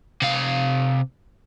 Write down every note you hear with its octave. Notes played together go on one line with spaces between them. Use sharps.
C3 F5